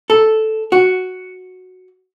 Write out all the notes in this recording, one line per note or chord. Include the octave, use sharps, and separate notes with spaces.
A4
F#4